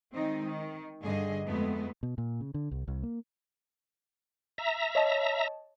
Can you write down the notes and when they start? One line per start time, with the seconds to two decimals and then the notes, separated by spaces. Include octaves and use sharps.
0.14 D#3 G#3 C4 D#4
0.46 D#3
1.02 G2 D3 G#4 D#5
1.45 F2 G#3 A3 B3
2.03 B2
2.18 A#2
2.41 C#3
2.54 D3
2.71 C2
2.88 C2
3.03 A#3
4.58 E5 A#5
4.95 C#5 D#5 A5